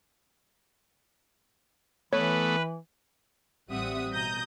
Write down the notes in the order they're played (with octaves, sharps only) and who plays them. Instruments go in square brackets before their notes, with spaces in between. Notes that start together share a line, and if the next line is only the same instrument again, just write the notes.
[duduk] E3 [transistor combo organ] A3 B3 [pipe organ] B4 [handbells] C#5
[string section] A1 G3 C4 E5 F#5 D#6
B2 A#5 D#6 G6 A#6